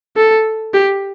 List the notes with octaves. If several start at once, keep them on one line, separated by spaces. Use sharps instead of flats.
A4
G4